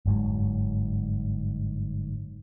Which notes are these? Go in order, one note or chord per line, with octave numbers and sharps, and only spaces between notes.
G1 G#2 F#3